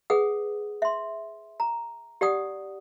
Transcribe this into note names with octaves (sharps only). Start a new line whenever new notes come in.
G#4 B4 F#5 D#6
E5 C6
A#5
G4 D5 F#5 D#6